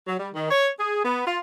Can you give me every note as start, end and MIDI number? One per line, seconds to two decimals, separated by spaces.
0.07 0.15 54
0.20 0.28 55
0.34 0.49 51
0.51 0.70 73
0.79 1.03 68
1.04 1.24 59
1.27 1.39 65